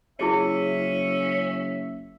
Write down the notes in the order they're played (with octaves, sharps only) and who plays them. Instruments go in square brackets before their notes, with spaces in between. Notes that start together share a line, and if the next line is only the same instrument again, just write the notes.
[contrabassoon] F#1 [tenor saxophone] C#4 [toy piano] E4 G#4 D#5 [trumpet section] E5